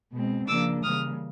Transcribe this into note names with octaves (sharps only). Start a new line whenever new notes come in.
B2 G#3 C4
C#3 F3 A#3 D4 D6 E6
C#3 E3 G3 A#3 D#6 F6